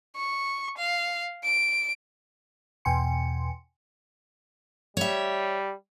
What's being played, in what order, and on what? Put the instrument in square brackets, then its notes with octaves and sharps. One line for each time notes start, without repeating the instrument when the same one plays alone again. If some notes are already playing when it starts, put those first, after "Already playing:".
[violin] C#6
F5
D7
[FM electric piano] E2 B2 G5 G#5 C6 C#7
[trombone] G3 [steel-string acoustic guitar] C#5 E5